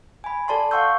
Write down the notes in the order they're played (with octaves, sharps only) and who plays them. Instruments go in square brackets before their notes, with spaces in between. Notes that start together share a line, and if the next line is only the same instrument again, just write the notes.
[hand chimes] G#5 B5
A4 D5 A5 C6
F5 F#5 C6 C#6 E6 G6